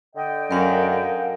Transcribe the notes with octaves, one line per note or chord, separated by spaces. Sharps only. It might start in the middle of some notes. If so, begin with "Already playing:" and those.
D3 D#5 G5
F#2 A#4 F5 F#5